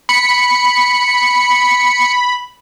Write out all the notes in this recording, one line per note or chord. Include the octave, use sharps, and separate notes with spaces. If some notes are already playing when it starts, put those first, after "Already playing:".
B5 C#7